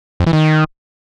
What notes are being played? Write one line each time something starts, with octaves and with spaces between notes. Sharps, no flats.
F2
E3
D#3